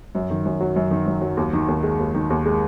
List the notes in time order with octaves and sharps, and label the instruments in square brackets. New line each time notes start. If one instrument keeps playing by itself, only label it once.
[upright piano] F#2
D#3
F#2
F#3
F#2
D#3
F#2
F#3
D#2
D#3
D#2
G#3
D#2
D#3
D#2
G#3